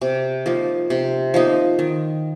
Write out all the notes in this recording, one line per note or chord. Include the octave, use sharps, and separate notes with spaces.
C3
F3 A#3 D#4
C3
F3 A#3 D#4
D#3